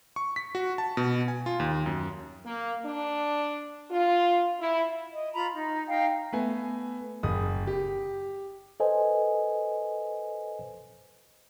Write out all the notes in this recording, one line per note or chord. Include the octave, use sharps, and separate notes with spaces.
C#6
B6
F#4
A5
B2
G#5
F4
D#2
F#2
A#3
D4
F4
E4
D#5
F4 A#5 B5
D#4
D#4 F5 G5
A3 B3 G#5
F#1 D#6
G4
A4 B4 C5 D#5 G#5